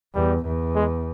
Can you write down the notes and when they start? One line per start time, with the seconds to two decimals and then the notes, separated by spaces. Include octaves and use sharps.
0.15 E2 G3
0.45 E2
0.76 G#3